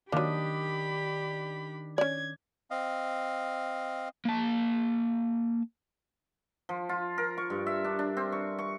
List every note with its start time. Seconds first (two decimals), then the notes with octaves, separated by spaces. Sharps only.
0.12 D#3 F#3 A#3 D4 G4 B5 D#6
1.98 C#4 D5 G#6
2.71 C4 D#5 F5
4.25 A#3 A5
6.69 F3
6.89 F4
7.18 A#4
7.37 C#6
7.50 G2
7.67 E5
7.84 D4
7.99 D4
8.17 C4
8.32 C#6
8.59 C#6